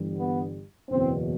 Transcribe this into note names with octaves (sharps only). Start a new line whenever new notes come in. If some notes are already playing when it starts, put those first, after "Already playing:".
Already playing: G1 G2 E3 G3
B3
F#1 E2 B2 C4